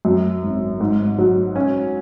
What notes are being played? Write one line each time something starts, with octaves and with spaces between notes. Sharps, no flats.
F#2
G#1
G#2
F#3
C#4